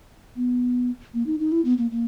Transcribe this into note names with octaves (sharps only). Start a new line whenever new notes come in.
B3
A#3
D#4
D#4
E4
B3
A#3
A#3